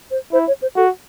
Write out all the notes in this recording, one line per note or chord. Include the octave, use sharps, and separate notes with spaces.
C5
E4 C5
C#5
C5
F#4 A4